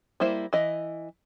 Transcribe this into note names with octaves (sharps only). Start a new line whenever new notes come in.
G3 A#3 E4 C5
E3 D#5